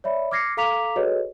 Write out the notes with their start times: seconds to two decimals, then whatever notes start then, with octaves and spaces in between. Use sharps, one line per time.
0.04 C#5 D5 E5 B5
0.31 D6 F6 G#6 A#6 C7 C#7
0.57 A4 F5 A#5 D6 B6 F7
0.96 F#4 G#4 A4 B4 C#5 D#5